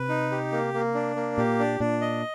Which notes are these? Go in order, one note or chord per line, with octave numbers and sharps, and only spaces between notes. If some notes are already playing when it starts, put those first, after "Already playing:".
Already playing: C3 B4
D#4
G4
A#3
A#3
D4
A#3
A#2 G4
D4
A#2 D4
D#5